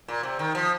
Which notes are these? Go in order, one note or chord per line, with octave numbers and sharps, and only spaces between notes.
A#2
C3
D#3
F3